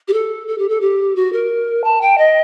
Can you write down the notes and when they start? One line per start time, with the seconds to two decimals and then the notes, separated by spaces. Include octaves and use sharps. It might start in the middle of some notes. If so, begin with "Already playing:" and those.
0.08 G4
0.13 A4
0.47 A4
0.58 G4
0.69 A4
0.81 G4
1.16 F#4
1.33 A#4
1.84 A5
2.01 G5
2.18 D#5